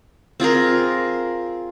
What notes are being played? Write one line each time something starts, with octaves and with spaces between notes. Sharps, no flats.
C4 F4 G#4 A#4